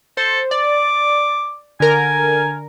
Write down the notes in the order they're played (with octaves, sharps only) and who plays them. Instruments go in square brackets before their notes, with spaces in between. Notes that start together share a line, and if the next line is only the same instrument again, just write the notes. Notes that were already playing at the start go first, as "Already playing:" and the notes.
[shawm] A4 [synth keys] C5
[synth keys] D5 [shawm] D6
[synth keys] D3 A#4 [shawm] G#5